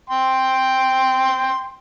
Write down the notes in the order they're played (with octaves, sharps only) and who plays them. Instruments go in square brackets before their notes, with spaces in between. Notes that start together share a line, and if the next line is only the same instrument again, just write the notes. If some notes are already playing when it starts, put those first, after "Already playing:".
[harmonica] G5 C6